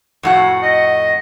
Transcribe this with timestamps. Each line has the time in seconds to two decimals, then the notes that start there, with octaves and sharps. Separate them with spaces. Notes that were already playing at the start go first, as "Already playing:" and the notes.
0.23 F2 A2 F#4 F#5
0.62 D#5